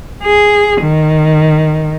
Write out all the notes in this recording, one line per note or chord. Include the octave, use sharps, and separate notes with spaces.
G#4
D#3